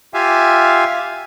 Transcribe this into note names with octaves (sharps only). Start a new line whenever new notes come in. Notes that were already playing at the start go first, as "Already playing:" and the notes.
F4 G4 E5 F5 G#5